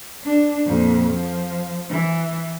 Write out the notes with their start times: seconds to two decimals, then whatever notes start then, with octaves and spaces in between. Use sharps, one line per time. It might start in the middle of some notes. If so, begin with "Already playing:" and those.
0.24 D4
0.66 F2 A#2
1.12 F3
1.90 E3